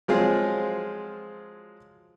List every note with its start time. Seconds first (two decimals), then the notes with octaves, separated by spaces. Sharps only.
0.08 F3 F#3 G#3 C4 F4 G#4